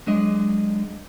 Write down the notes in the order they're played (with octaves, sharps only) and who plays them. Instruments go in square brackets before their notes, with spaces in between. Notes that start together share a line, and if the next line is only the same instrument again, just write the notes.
[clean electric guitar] F#3 G#3 D4 D#5